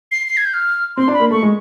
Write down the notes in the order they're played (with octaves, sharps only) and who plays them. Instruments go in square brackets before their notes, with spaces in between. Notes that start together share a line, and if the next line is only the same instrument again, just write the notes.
[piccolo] C7
C7
G#6
G6
F6
[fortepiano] C4 [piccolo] C6
[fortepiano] D4
[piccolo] B5
[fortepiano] A#3
[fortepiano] A3 [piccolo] C#6
[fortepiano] G#3